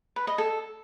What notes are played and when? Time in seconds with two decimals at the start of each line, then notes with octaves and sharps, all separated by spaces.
0.16 B4
0.27 D#5
0.38 A4